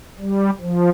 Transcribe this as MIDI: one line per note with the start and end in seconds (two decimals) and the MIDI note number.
0.19 0.51 55
0.61 0.90 53